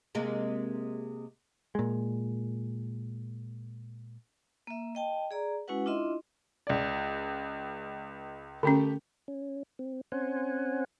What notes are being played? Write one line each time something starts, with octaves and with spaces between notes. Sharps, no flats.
C3 G#3 A#3
A#2 G#3
A#3 E5
D#5 G5 A5
G#4 D5 A#5
G#3 C#4 E4 F#4 B4 F#5
D4 E4 F4 D#5 E5 C6
C#2 D5
D3 A3 C#4 G4
C#4
C4
C4 C#4 C5 F#5 G#5